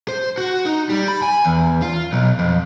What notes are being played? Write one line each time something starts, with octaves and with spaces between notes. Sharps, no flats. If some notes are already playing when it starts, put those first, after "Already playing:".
C5
F#4
D#4
G3
B5
G#5
E2
F4
B1
F2